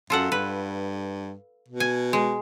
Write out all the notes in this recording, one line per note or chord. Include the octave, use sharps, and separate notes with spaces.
F#2 F4 A4 F#5
G2 B4
B2
G#5
G#3